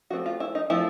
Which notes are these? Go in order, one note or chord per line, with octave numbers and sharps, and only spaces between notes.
F3 A3 C4 F#4
F4
E4
D#4
F3 A3 C4 E4